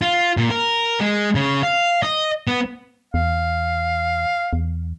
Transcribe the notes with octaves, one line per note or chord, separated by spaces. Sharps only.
F4
A#2
A#4
G#3
C#3
F5
D#5
B3
E2 F5
E2